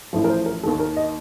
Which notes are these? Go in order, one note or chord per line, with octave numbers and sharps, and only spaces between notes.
A1 A2 F3
A#4
C5
A#4
D#2 D#3 A#3 A4
A#4
D#5